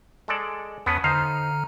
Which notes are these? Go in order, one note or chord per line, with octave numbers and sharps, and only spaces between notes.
G#3 A4 D5
E2 B3 C#4 B4 A5 D#6
D3 D#4 C5 F5 A#5 F6